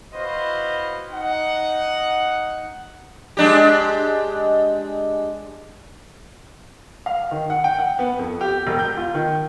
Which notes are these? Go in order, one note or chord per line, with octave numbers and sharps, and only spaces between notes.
E4 F#4 B4 C5 D#5 F5
D#4 F#5
G#3 D4 G4
F5
D#3
F#5
G5
F#5
B3
F2
G4
E1
G6
F4
D#3